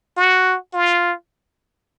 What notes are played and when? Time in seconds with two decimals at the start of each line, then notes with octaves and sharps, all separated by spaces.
0.17 F#4
0.74 F4